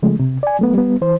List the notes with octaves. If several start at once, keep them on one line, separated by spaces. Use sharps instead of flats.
C#3 F3 G#3 A3
C3
D5 G#5
F#3 A3 B3
G3 B3
E3 C5